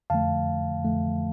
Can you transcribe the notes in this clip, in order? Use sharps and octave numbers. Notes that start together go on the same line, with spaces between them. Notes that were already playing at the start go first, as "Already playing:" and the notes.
F2 D3 F3 A3 F5 A5
F2 D3 F3 A3